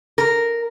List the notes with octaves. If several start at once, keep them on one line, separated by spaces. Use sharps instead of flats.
A#4